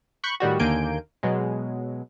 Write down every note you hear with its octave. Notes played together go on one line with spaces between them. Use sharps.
B5 C#6 F#6 G6 C#7
A2 D#3 G3 F#4
D#2 D3 A#3 G#5 G6 D7
B2 F#3 G#3